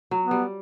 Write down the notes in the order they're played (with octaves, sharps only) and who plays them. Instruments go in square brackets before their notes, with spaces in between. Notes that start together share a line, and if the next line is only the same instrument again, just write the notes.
[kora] F#3
[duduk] B3
[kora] G3